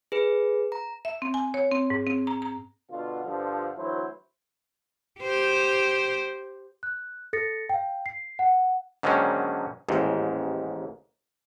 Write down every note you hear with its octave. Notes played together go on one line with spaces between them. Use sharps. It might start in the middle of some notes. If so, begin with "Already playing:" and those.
G#4 B4
A#5
E5
C4
G#5
C#5
C4
G#2
C4
A#5
A#5
B2 D3 F4
G2 D3 F3
D2 E3 F#3 E4 C5
G4 C5
F#6
A4 A6 A#6 C#7
F5 G5
C7
F#5
G#2 D3 D#3 F#3 A#3 C#4
A1 D#2 G#2